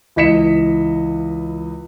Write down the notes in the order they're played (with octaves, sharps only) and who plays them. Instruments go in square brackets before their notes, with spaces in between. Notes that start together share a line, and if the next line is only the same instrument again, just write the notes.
[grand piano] C#2 E3 D#5 B6 C#7 E7